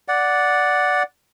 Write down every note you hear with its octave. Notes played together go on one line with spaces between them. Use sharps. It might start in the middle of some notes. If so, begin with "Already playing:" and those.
D5 F#5